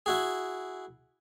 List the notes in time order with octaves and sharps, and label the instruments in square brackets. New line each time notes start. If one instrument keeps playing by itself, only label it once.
[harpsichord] E4 F#4 G#4